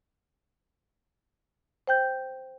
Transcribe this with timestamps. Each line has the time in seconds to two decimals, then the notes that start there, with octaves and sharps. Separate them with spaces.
1.87 C5 G5 G6